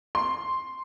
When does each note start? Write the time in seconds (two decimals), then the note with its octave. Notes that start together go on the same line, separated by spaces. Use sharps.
0.15 C6